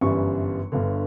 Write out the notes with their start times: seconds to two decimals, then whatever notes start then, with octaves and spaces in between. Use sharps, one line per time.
0.01 G1 F#2 E3 G3 C#6
0.72 G1 G2 D3